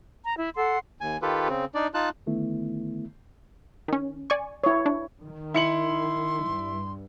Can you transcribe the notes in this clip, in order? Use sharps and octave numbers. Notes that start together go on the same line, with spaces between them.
A#5
E4
A4 F#5 C6
D#2 G#5
D#3 F4 G4 A4 B4
C#3 C4
D4 D#4 D5
D#4 F4 A5 F#6
D3 D#3 A3 B3 E4
D#3 C#4
D5 G#5 C#6
E4 C#5
D4
D#3
E4 C6 C#7 F#7
G2